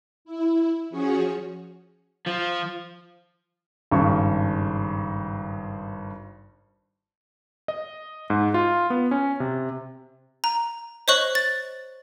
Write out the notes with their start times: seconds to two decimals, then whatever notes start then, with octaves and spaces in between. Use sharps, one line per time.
0.25 E4
0.90 F3 C#4 F#4 G#4 C#5
2.27 F3
3.92 G#1 G2 C#3 F5 C#6
7.68 D#5
8.30 G#2
8.54 F4
8.90 B3
9.11 C#4
9.40 C3
10.44 A#5
11.08 C5 C#5 D#5 C#6 F#6 F#7
11.35 A6